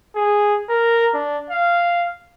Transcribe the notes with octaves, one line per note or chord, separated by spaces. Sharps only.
G#4
A#4
D4
F5